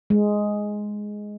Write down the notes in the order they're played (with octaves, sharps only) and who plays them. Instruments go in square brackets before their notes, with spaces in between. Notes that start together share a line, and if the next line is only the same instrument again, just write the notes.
[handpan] G#3